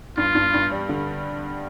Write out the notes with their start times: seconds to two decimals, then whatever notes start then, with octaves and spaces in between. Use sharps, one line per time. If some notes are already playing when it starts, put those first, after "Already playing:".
0.17 G2 F4
0.35 G2
0.54 G2
0.71 G3
0.89 D3